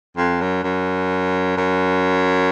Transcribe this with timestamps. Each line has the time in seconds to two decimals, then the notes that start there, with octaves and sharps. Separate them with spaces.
0.17 F2
0.41 F#2
0.64 F#2
1.57 F#2